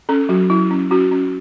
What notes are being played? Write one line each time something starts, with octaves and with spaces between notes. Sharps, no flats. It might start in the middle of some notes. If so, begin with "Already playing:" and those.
C#4 A4
F#3 F#4
F#3 E4
C#4
C#4 F#4
C#4